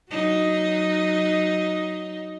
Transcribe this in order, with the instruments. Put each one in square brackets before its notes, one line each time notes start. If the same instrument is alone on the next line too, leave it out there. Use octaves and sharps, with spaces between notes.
[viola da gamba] F#3 D#4